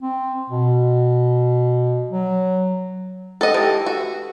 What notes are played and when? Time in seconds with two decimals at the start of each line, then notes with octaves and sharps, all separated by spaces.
0.01 C4
0.50 B2
2.10 F#3
3.41 A4 D#5 F#5 A#5
3.54 E3 G4 A4
3.86 F#4 E5 E6